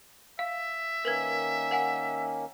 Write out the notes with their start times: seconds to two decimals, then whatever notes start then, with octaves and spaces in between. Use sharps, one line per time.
0.39 E5 F5
1.05 D#3 A#3 C#4 A#4 B4 G#6
1.71 A#4 F#5 G#5